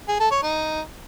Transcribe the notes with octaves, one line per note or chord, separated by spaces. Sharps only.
G#4
A4
C#5
D#4